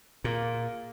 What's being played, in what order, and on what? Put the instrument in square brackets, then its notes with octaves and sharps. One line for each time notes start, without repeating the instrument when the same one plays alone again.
[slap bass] A#2 [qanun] A#3 G#4